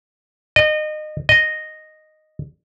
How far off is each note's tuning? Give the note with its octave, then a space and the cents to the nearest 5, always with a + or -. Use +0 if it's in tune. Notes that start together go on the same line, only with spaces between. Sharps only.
D#5 -25
D#5 -5